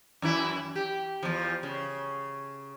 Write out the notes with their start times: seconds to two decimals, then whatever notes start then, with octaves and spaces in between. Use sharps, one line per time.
0.22 F#2 E3 E4
0.75 G4
1.23 E2 F3
1.63 C#3